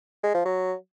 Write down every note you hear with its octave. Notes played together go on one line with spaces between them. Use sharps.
G#3
F3
F#3